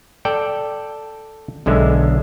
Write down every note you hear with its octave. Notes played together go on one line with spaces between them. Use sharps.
A4 D5 G5
B1 D3 G#3 E5